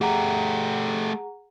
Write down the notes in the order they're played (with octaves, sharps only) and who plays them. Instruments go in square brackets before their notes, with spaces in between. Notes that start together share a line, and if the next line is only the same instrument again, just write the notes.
[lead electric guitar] A3 G4 [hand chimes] G#4 F#5 A#5